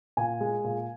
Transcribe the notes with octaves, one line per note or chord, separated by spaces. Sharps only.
A#2 G#5
G#3
A#2